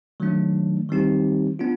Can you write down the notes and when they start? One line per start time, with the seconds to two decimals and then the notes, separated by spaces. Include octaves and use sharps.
0.20 D#3 F#3 A3 D4
0.89 D#3 G3 C4 D#4 G4
1.59 B3 D4 F4